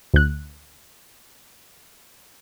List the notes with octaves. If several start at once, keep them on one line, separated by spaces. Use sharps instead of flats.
D2 F#6